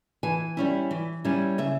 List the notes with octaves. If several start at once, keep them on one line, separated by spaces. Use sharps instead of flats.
E3 G#5
G3 C#4 E4
E3
G3 C#4 E4
C#3 E5